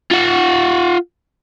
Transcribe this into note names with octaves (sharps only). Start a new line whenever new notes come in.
F4 F#5